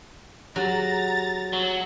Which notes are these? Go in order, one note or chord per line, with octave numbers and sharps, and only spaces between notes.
F#3 G4 G#4 A#5 A6
F#3